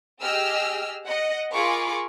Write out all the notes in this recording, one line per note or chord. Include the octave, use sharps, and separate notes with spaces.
G4 G#4 D#5 E6 F6
D#5 F#5
F4 G#4 A#4 B5 C#6 D6